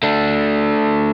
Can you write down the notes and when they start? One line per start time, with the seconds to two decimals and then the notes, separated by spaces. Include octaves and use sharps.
0.03 A3 D4